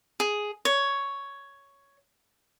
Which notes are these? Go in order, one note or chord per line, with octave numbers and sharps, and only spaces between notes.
G#4
C#5